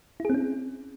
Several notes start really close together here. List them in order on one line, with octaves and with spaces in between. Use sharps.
E4 G#4 C4 C#4